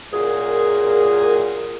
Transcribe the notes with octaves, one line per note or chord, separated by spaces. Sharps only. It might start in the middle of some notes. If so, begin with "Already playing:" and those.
F#2 A#2 G#4